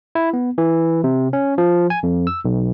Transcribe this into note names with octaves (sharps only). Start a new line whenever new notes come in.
E4
B3
E3
C3
C#4
F3
G#5
F2
E6
B1